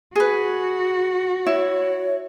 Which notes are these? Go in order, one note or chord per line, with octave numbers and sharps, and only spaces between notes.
F#4 G#4 B4
E4 C#5